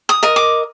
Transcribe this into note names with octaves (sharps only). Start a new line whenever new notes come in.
D#6
A#4 D#5
D6